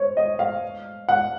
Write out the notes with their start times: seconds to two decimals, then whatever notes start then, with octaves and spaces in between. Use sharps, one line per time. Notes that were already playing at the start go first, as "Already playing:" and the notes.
Already playing: C5 C#5
0.17 D#5
0.39 F5
1.09 F#5